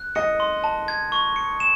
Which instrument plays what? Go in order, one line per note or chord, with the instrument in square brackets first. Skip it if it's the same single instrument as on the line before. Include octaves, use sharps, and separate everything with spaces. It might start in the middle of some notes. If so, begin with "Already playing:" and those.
Already playing: [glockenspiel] F#6
[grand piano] D#5 [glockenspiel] C#7
[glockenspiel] C6
A5
G#6
C#6
C#7
E7